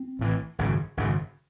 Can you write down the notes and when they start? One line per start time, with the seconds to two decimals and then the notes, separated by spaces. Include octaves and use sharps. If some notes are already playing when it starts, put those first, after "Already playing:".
Already playing: C4
0.19 A1 A2 E3
0.59 G#1 F#2 C#3
0.97 G#1 F#2 C#3